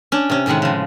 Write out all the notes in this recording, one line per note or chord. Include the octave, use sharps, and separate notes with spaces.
C#4 D4
C3 C#4
A2 C3 D#3 G#3 F#5
C#3 F3